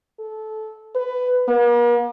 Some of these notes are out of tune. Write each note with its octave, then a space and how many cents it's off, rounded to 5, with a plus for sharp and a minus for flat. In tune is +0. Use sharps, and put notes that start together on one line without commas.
A4 -15
B4 +15
A#3 +45